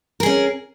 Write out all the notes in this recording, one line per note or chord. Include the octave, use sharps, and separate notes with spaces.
C#4 G#4 A#4